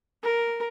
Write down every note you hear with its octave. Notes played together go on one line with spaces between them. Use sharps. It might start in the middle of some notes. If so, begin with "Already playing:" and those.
A#4